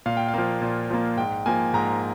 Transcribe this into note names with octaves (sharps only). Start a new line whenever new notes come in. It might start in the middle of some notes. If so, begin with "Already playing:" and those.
A#2 F5
G5
F5
F3 A#3
A#2
F3 A#3
G#2 G5
F3 A#3 G#5
G#2 A#5